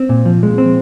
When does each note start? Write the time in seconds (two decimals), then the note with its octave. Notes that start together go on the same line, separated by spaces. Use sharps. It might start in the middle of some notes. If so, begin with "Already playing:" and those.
Already playing: C4
0.09 A#2
0.25 F3
0.43 G#3
0.58 C4